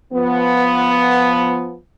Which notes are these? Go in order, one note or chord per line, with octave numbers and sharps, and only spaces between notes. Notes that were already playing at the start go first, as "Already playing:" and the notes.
F3 B3